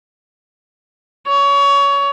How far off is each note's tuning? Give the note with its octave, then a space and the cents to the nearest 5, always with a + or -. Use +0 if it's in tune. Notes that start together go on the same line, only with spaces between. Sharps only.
C#5 +25